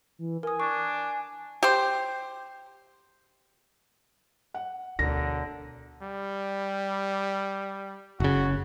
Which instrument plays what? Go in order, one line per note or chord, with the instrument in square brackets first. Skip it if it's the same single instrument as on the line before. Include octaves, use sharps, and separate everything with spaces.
[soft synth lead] E3
[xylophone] A#4 D#6 [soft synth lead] G#5
[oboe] D4 [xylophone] C#6
[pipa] G4 C5
[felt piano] F#5
[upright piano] E1 [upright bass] D2 [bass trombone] D3 [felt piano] A#6
[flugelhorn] G3
[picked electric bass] F#1 C#3 [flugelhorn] F#4